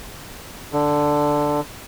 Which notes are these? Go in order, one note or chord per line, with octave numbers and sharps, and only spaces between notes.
D3